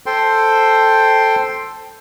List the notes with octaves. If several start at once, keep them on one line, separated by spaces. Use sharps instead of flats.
A4 C5 G5 C6